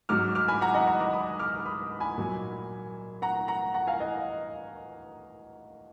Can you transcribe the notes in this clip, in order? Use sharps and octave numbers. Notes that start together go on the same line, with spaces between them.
G#2 F#3 D6 F6
D6 F6
G#5 B5
F#5 A#5
D#5 F#5
F#5 A#5
A#5 D6
B5 D#6
D6 F6
B5 D#6
G#5 B5
A#2 F#3
F#5 A#5
F#5 A#5
F#5 A#5
F5 G#5
D#5 F#5